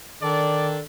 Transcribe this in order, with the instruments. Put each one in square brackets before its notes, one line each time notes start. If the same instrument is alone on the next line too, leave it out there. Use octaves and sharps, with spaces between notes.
[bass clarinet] D#3 [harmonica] D4 A4 [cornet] D5